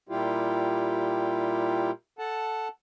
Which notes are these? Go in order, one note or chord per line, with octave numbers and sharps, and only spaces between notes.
A#2 G3 E4 F4 G4
A4 F#5 A5